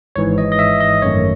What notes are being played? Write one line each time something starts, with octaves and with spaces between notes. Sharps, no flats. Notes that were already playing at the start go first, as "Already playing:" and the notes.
G#1 G#2 E3 C#5
D#5
D#5
E5
D#5
G#1 F#2 D#3 A3 C#5